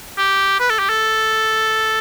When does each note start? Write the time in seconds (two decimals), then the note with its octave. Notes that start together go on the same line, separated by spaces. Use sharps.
0.18 G4
0.60 B4
0.70 A4
0.79 G4
0.89 A4